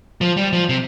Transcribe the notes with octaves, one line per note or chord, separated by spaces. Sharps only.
F3
G3
F3
C3